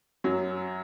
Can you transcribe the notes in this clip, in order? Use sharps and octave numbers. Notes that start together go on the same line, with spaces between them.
F#2 F#3